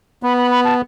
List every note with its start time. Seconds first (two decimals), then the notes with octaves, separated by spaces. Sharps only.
0.23 B3 B5
0.38 B5
0.51 B5
0.65 A5